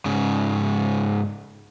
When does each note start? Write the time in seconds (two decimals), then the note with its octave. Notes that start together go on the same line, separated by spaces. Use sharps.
0.05 G#2 C#3